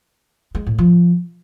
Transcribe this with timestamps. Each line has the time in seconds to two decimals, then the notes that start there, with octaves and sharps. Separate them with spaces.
0.55 G#3
0.67 A2
0.78 F3